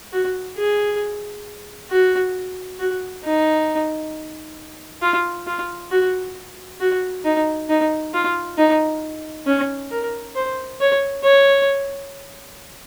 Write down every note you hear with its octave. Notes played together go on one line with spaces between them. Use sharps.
F#4
G#4
F#4
F#4
D#4
F4
F4
F#4
F#4
D#4
D#4
F4
D#4
C#4
A#4
C5
C#5
C#5